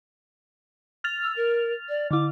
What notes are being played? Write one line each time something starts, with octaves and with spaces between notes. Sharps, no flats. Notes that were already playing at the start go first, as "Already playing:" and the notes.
F6 A6 F7
E6
A#4
D5
D3 E4 D6